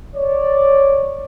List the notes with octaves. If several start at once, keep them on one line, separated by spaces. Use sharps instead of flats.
C#5 D5